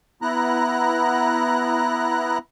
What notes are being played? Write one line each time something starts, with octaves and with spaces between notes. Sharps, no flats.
B3 E4 A#5 F#6